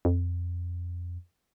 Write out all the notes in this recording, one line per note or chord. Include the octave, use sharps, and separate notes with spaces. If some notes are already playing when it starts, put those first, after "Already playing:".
F2